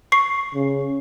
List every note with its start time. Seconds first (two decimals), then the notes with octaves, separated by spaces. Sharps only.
0.12 C#6 C7
0.54 C#3